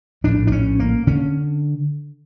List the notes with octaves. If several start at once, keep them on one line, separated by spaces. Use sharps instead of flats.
A#1 A2 D4
D4
C#4
A#3
D3 C#4